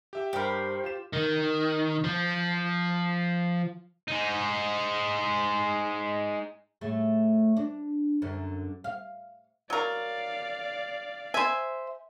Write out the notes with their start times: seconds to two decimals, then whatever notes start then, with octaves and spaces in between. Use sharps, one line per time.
0.13 G4 E5 G5
0.33 G2 G4 A#4 C5 B5
0.84 F4 G4 E7
1.13 D#3
2.04 F3
4.08 G#3 D#4
6.81 A2 A3 G#4
7.57 D4
8.22 F#2 D3
8.84 F5
9.70 F#3 A#4 D5 F5
11.34 C5 E5 G#5